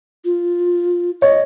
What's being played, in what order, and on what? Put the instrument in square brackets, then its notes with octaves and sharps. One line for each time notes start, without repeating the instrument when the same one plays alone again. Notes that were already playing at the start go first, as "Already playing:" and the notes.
[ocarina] F4
[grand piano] C#5 [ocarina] D#5